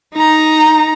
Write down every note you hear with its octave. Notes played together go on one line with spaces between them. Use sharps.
D#4 A#5